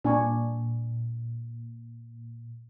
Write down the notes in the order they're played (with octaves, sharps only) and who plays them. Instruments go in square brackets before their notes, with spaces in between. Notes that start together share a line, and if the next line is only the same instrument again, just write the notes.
[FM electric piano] A#2 [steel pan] D4 G#5 C#6